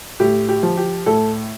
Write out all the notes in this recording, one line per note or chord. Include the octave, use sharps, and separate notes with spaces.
A2 G4
G4
F3
G4
A2 A4